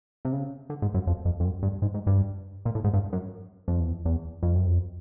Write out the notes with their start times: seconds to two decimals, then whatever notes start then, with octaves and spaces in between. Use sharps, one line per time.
0.25 C3
0.32 C#3
0.70 D3
0.82 G#2
0.94 F#2
1.07 F2
1.25 F2
1.40 F2
1.45 F#2
1.63 G2
1.82 G#2
1.94 G#2
2.07 G2
2.65 A#2
2.75 A2
2.84 G#2
2.94 G2
3.13 F#2
3.68 F2
3.80 E2
4.05 E2
4.43 F2
4.55 F#2
4.66 F2